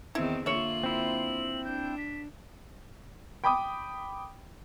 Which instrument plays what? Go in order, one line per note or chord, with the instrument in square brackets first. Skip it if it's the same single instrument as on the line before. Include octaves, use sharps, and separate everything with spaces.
[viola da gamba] E2 D#3 C4 [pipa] E4
[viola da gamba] D3 A#3 F4 [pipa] C#5 E5 [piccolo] F#7
[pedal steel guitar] C4 E4
[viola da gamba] D4 [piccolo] G6
[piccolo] B6
[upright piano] G5 B5 D6 D#6